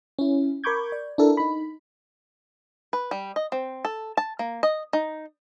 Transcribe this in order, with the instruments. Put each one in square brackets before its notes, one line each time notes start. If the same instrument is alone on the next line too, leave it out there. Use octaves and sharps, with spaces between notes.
[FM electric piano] C#4 E4
A#4 B5 C#6 D6 G6 G#6
D5
D4 E4 A4 A#4
D#4 B5
[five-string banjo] B4
G3
D#5
C4
A4
A5
A#3
D#5
D#4